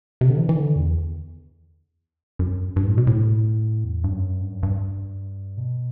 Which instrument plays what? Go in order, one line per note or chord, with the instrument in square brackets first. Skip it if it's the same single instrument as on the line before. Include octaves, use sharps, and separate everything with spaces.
[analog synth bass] C3
D3
E3
E3
D3
E2
F#2
G2
A2
B2
A2
E2
G2
F#2
G2
F#2
G2
B2